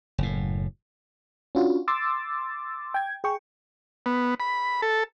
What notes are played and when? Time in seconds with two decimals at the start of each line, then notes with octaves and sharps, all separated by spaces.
0.18 F#1 A2
1.55 C#4 D4 F4 F#4
1.88 C6 D6 E6 A6
2.94 G5 G#6
3.24 G#4 G5 C#6
4.06 B3
4.40 B5
4.82 A4